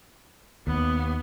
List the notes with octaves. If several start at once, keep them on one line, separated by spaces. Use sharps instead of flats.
D#2 B3